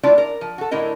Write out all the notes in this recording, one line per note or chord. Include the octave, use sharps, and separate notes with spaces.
A3 D4 E4 F4 D5
A#4
F3
F#4 A4
A2 D3 E4 A#4 D#5